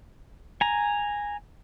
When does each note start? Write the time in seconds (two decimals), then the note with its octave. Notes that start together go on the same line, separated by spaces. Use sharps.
0.61 G#5 A#5